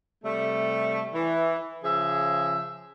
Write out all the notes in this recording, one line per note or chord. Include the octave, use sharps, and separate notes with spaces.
C3 G3 A3
E3
C#3 F3 G#4 E5